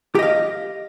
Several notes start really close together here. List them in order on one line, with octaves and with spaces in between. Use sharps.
G4 D#5 F5